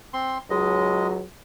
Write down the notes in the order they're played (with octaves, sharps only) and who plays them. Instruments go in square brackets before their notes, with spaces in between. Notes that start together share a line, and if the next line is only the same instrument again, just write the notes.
[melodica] C4 C6
[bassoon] C#2 [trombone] F#3 [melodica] G#3 D#5